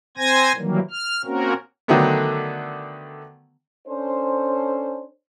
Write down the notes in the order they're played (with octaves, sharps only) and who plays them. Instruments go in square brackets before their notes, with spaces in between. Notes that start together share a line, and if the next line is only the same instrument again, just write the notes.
[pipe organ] C4 C5 G#5 G#6 A#6
D#3 E3 F#3 G3 A#3
F6
A#3 C4 C#4 F#4 A#4
[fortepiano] D3 D#3 F#3 A3 B3
[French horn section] C#4 D4 A4 C5